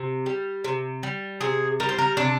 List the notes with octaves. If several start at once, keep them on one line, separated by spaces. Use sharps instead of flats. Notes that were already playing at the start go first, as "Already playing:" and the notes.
Already playing: C3
G3
C3
G3
C3 G#4
G3 A#4
C5
A#4
C3 D4